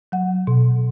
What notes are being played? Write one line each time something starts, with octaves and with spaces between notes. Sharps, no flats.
F#3 F#5
B2